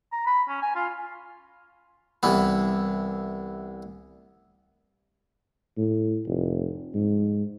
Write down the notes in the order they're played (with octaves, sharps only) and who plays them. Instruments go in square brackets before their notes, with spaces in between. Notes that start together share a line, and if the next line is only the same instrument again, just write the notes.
[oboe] A#5
B5
C#4
G#5
F4
[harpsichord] C2 E3 B3
[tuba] A2
F1
G#2